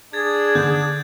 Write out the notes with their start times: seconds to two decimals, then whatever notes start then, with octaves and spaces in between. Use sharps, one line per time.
0.13 D4 G#4 G#6 A6
0.55 D3 G6